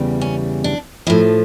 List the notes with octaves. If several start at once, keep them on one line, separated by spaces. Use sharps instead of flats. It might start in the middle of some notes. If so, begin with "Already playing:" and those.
Already playing: E2 C#3 G3
C#4
D4
A2 F3 E4